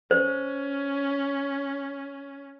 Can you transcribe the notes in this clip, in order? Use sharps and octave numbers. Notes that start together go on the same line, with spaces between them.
C#4 C5